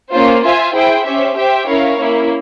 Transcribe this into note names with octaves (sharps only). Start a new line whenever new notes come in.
A#3 C#4 F4 C5
F4 C5 E5 G#5
E4 G#4 C5 G5
C#4 G4 C5 E5
G4 C5 E5 G5
C#4 E4 A#4 C#5 F5
A#3 C#4 E4